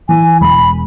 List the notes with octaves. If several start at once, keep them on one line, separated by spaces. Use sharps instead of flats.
E3 G#5
E1 B5